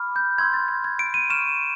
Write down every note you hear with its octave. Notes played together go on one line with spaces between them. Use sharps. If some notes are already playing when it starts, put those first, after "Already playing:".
Already playing: B5 D6 F6
G6
C6 E6 G6 G#6
A6
G#6
G#6
D7
D#7
C#6 F6 E7